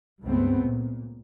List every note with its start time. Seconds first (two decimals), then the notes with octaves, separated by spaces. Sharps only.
0.23 C#2 G2 A3 B3 C4
0.62 A#2